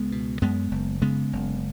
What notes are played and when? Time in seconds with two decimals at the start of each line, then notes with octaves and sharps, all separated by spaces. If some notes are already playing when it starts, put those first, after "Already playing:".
Already playing: C#2 G#3 B3
0.12 B2
0.42 F#2 G#3 B3
0.71 F#1
1.02 C#3 G#3 B3
1.33 F#1